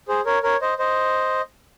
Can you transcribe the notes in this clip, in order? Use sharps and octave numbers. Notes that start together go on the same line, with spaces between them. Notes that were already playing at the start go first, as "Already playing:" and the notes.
G#4 C5
A#4 C#5
A#4 C#5
C5 D#5
C5 D#5